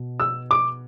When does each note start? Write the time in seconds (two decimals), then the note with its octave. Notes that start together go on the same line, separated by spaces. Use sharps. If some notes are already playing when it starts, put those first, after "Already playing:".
Already playing: B2
0.20 E6
0.51 D6